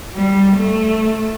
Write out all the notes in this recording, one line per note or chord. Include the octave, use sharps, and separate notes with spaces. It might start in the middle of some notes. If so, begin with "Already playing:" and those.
G3
A3